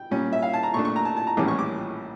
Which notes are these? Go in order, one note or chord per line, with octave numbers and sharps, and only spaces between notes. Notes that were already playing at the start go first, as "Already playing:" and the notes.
Already playing: G5
A#2 G3 C#4
E5
F5
A5
A#5
A#2 A3 D4 C#6
C#6
A#5
A5
A5
A#5
A#1 A2 E3 G3 C#4 D6
C#6
D6